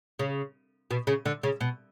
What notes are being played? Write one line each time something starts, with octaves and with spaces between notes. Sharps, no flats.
C#3
B2
C#3
D3
C#3
B2